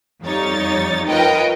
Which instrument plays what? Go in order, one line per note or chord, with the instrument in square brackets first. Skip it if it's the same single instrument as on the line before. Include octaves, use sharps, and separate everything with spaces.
[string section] F2 G3 D#4 C#5 A6
F4 A#4 B4 C#5 D#5 G5